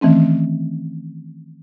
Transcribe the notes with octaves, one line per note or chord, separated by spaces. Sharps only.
D#3 E3 A3 C4 C#4